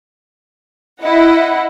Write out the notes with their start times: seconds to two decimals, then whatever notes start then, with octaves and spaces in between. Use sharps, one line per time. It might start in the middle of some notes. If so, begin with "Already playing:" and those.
1.02 E4 D#5 F#5